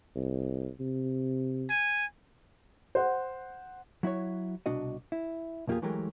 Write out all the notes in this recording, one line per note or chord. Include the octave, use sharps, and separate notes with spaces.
C2
C3
G#5
C5 F#5
F#3 E4 F#4 C#5
C2 B2 D4 F#4 D#5
E4
B1 F2 A#3 F4 G4 G#4
E3 F#3 G#3 A3 G4 A#4